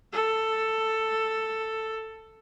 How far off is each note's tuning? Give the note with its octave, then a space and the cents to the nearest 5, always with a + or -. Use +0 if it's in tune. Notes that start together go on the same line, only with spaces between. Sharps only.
A4 +10